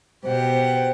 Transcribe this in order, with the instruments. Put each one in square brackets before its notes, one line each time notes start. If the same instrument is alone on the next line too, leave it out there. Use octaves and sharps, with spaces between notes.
[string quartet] B2 G4 F#5 [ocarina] C5